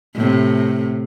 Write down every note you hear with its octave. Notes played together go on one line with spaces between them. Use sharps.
A2 C3